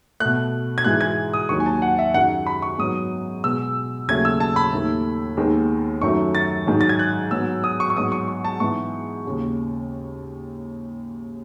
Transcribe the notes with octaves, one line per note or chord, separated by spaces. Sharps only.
B2 A3 F#6
G#6
G#2 E3 G#3 F#6
G#6
D#6
D#2 D#3 F#3 C#6
G#5
A5
F#5
E5
F#2 D#3 G#3 F#5
B5
C#6
G#2 F#3 B3 D#6
B2 G#3 B3 E6
D#2 C#3 F#3 A3 G#6
E6
A5
B5
D#2 D#3 A3
D#2 D#3 G#3 B3
F#2 D#3 F#3 A3 C#6
A6
G#2 D#3 F#3
A6
G#6
F#6
G#2 F#3 B3 E6
D#6
C#6
C#6
G#2 F#3 B3 D#6
C#6
C#6
A5
G#2 E3 B3 C#6
D#2 C#3 G#3